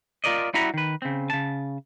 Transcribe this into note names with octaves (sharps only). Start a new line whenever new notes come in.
F4 A#4 D5 D#5
G3 E4 F#4 F#5 A#5 B5
D#3 B4
C#3 C4
C#3 A5